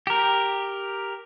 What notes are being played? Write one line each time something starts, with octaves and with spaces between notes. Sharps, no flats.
G4 A#4